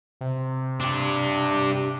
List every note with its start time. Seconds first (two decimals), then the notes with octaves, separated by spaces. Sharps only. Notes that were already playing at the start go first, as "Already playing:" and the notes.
0.21 C3
0.80 D4 G4